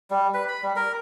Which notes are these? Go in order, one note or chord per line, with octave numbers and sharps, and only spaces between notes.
G3
B4
B5
G3
A#4